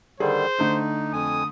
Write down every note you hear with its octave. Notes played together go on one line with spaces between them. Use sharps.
D3 D#3 G3 G#4 C5
D3 A3 D#4
F2 G#5 D#6